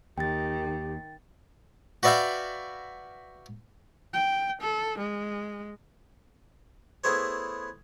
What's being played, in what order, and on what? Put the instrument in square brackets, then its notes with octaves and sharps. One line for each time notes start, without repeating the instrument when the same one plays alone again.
[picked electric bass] D#2 [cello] D#3 [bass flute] G4 [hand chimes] G5 A6
[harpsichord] F#4 B4 D5 E5 F5 G5
[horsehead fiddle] G5
A4
G#3
[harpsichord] A3 B3 E4 G#4 C5 C#5